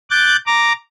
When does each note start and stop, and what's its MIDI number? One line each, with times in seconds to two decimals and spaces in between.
0.11 0.37 86
0.11 0.37 90
0.11 0.37 91
0.11 0.37 93
0.47 0.73 82
0.47 0.73 86